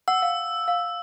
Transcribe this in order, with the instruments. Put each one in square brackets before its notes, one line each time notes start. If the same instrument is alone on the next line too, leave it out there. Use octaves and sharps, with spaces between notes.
[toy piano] F#5 [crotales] E6
[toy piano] F5
F5